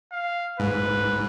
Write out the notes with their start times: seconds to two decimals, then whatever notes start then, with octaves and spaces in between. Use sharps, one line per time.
0.12 F5
0.60 G#2 B4